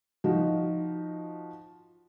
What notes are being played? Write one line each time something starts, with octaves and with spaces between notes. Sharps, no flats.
F3 D#4 F#4